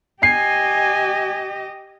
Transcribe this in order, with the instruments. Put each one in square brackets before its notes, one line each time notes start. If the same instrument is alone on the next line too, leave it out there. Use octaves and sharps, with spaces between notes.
[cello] G4 D#5 [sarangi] G#5 [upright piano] C7